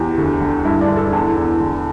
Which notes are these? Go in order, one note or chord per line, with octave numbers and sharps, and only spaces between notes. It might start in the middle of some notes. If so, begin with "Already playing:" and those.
Already playing: E2 G4
D2
D3
G2 E4
D4
D3
A4
E2
E2
D3